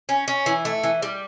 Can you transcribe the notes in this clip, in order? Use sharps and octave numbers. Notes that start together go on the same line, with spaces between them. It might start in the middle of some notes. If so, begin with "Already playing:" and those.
C#4
C#4
E3
A3
E3
G3